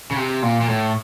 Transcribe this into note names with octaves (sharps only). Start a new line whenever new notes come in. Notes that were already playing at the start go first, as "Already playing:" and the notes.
C#3
C3
A#2
A#2
A2